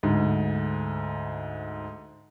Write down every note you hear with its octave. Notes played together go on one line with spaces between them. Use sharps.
D2 G#2